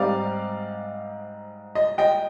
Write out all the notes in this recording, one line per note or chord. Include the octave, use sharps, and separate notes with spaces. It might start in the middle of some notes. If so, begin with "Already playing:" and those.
Already playing: G#2 G3 C4 D#4 D5 F5
D#5
D#5 G5